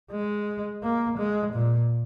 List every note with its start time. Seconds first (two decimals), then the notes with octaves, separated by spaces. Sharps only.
0.11 G#3
0.83 A#3
1.18 G#3
1.53 A#2